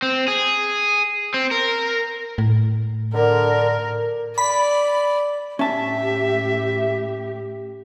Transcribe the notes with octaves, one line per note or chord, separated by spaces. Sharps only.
C4
G#4
C4
A#4
A2
D3 A#4
D5 B5
A2 C#4 G4 E5 A5